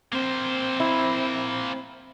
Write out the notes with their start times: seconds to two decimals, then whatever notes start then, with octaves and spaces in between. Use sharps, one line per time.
0.12 A#3 C4 C5
0.80 E4